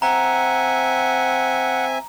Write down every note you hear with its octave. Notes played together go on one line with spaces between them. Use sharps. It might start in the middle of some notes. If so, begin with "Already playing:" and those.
C4 E5 F#5 G#5 A#5